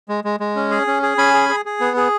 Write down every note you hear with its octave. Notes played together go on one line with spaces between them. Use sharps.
G#3
G#3
G#3
C#4
G#4
C#4
G#4
C#4 G#5 B5
G#4
G#4
G#4
B3
G#4